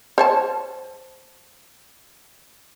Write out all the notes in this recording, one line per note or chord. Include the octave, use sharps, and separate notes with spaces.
C5 C#5 A5